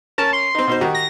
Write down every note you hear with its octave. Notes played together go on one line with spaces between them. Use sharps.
C#4 A#4 A5
C6
C4 D#4
B2 D#4 C5
D#3 F#4 G4
A#6